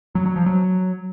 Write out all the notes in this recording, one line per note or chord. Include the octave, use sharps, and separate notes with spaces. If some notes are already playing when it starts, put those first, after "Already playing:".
F#3
F#3
F3
F#3